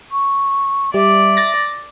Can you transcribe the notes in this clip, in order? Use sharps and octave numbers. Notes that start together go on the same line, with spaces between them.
C#6
G3 D5 E5
A6 A#6